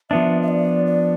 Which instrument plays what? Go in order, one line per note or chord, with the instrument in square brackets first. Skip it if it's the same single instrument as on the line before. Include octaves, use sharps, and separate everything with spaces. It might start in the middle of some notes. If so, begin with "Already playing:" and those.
[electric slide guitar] F3 B3 D4 [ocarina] E5
[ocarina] E5
D5
D5